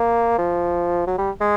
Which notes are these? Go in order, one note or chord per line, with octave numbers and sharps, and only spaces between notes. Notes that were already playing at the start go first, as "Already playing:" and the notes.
Already playing: A#3
F3
F#3
G3
G#3